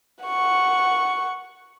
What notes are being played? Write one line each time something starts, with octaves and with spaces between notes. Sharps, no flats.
F#5 C#6